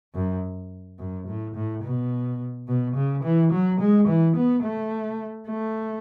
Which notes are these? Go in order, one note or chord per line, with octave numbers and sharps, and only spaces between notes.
F#2
F#2
A2
A2
B2
B2
C#3
E3
F#3
G#3
E3
B3
A3
A3